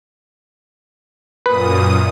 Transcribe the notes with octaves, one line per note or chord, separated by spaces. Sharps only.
F#2 A#2 B4 D#6